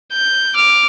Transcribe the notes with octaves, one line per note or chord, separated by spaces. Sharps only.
G6
D6 F6